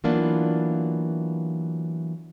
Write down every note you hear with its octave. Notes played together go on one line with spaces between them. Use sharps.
E3 F#3 A#3 B3 D4 F4